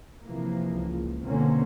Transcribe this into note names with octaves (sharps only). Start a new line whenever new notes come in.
C3 E3 F3 A#3
C#2
B2 D3 A#3 C4 C#4